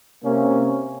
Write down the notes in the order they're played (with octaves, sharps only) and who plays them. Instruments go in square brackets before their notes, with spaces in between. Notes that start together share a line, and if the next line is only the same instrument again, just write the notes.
[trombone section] C3 A#3 C#4